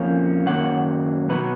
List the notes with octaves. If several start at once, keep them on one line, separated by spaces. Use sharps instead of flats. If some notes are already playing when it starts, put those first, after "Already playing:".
Already playing: F2 F3 A#3 C#4
F#2 D#3 F#3 A#3 F#5
B2 F#3 B3 B4